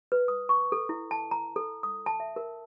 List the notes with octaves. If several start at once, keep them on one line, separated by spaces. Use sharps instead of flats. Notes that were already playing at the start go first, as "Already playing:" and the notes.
B4
D#6
C#6
A4
E4
A5
A#5
A4
D#6
A5
E5
A#4